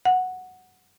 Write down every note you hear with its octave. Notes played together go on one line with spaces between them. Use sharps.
F#5